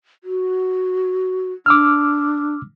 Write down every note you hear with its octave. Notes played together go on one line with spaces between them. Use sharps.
F#4
D4 D6 E6 F6